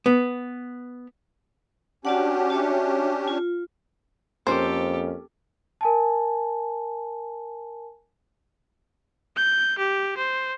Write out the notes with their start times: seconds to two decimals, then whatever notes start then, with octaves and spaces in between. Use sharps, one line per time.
0.06 B3
2.05 C#4 D4 F#4 G4 D5 F#5
2.50 F#4 C#5 E5
3.28 F4
4.47 F2 A#3 C#4 G4 A4 C5
5.81 A#4 G#5 A5
9.36 G6
9.78 G4
10.17 C5